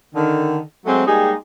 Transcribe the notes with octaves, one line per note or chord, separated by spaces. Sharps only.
D3 D#3
F#3 G#3 A3 C4
G3 G#3 A#3 D#4 G4 G#4